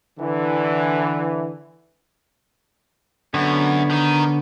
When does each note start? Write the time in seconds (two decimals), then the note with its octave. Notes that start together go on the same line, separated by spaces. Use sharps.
0.19 D3 E3
3.34 F#2 D3 B3 C#5
3.90 D#3 D#4